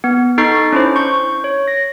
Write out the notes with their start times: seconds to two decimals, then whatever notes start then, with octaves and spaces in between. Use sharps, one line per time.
0.04 B3
0.38 D#4 A4 C#6 G6 A6 C7
0.72 C#4 D4 E4 C5
0.96 C#6 G6
1.44 C#5
1.68 A#6